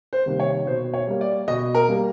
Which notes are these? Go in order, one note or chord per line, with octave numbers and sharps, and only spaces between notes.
C5
C3 D#3 G3 A#3
C#5
B2 C5
C#5
G3 A#3
D5
B2 D#5
A#4
G3 A#3